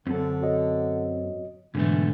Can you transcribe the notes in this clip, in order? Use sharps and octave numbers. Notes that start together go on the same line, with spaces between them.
F#2 D3 C4 A4
F#4 C#5 D#5
G#2 B2 D3 E3 A3